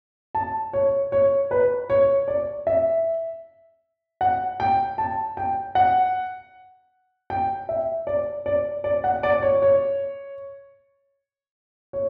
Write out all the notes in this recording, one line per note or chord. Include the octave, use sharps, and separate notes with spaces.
A5
C#5
C#5
B4
C#5
D5
E5
F#5
G5
A5
G5
F#5
G5
E5
D5
D5
D5
F#5
D5
C#5
C#5
C#5